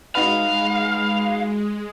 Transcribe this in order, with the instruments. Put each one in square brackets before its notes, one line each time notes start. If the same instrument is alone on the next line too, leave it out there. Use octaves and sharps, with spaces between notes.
[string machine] G#3 [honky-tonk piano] D#4 F#4 B4 [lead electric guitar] F5